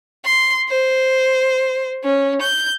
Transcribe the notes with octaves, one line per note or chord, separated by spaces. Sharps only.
C6
C5
C#4
G6